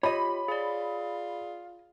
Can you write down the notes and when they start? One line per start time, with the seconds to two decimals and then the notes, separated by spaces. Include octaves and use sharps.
0.03 F4 G4 C#5 D#5 B5
0.48 F4 G#4 D5